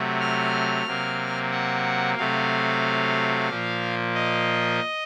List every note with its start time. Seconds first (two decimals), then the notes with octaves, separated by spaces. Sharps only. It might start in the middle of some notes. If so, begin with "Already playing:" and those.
Already playing: C3 F#3 A3
0.21 F6
0.86 C3 F#3 A#3
1.51 F#5
2.18 C3 F#3 A3 F5
3.49 A#2 F3 A#3
4.14 D#5